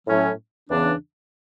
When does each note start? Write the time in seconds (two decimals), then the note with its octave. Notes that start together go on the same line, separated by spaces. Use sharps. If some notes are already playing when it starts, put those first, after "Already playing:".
0.07 A2 F#3 C#4
0.70 E2 C#3 E3 B3 D4